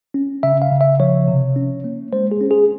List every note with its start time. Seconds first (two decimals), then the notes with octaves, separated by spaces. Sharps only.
0.14 C#4
0.43 C#3 E5
0.62 F5
0.72 C#3
0.81 E5
1.00 F3 C#5
1.28 C3
1.56 C#4
1.84 A#3
2.13 G#3 C5
2.31 G#4
2.41 C#4
2.51 G#4